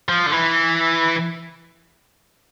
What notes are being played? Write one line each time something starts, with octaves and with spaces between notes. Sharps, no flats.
F3
D3
E3